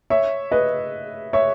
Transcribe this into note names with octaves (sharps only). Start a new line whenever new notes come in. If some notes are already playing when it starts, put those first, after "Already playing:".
C#5 E5
B4 D#5
C#5 E5